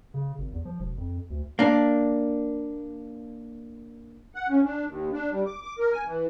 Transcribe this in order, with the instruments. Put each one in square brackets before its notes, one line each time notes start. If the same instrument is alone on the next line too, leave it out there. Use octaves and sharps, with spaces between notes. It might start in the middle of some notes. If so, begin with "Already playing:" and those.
[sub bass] C#3
G#1
E2
F3
E1
F2
D2
[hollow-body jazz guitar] A#3 D4
[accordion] F#5
C#4
D4
D#2
D4
G3
D6
D6
A#4
G#5
E3